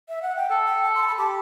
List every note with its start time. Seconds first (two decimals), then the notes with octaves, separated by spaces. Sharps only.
0.09 E5
0.22 F#5
0.36 G5
0.50 A4 A5
0.67 G5
0.84 A5
0.95 C6
1.02 A5
1.07 B5
1.18 G4 A5